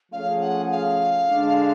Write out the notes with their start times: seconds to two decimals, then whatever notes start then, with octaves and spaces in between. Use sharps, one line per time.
0.12 F3 A3 C#4 G#4 C#5 F5
0.41 F#5
0.72 F5
1.30 D3 G#3 D4